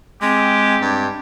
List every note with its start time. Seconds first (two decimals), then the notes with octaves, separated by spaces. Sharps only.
0.22 G#3 C4 G4
0.81 G2